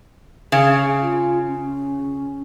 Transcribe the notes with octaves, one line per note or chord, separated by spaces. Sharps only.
C#3 G#4
F4
C#4